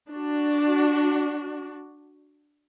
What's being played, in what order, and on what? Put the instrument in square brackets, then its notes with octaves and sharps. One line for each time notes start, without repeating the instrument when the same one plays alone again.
[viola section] D4 F#4